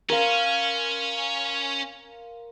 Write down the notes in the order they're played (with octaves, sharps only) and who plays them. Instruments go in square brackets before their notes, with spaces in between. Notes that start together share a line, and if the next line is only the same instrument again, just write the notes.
[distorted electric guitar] C#4 [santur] A#4 C5 F5